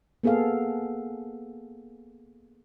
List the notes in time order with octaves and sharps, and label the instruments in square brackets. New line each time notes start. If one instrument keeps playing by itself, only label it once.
[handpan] A#3 B3 G#4 A4 F5